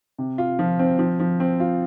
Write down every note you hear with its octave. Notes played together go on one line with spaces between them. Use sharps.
C3
F4
F3
C4
F3
F3
C4
F4